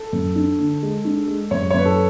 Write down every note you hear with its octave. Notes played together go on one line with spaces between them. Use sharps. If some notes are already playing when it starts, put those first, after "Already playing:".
Already playing: A4
F#2
D4
D3
G#3
D4
G#3
F#2 C#5
C#5
F#2 B4
A4